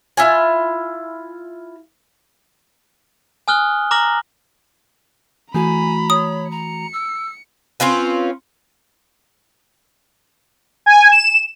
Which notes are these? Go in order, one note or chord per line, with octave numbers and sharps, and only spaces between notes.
E4 F4 G#5
G#5 D#6 F6 F#6 G7
A#5 D6 F6 A#6 F#7
E3 A3 F#4 G#5 A#5 B5
C#5 D#6
A#5 C#7
E6
C4 C#4 F4 B4
G#5
E7